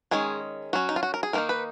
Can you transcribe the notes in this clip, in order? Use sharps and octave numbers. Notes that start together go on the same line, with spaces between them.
D#3 G#3 C#4 G#4
F#3 C#4 F#4
D#4
F4
F#4
A#4
G#4
D#3 A#3 D#4 A#4
B4